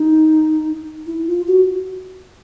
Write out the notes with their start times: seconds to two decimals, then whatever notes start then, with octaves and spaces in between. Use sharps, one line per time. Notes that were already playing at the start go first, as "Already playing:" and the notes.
Already playing: D#4
1.06 E4
1.27 F4
1.47 F#4